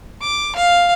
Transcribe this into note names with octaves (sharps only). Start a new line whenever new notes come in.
D6
F5